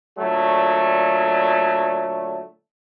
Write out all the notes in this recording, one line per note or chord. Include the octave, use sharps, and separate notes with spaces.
A#2 D3 F#3 A3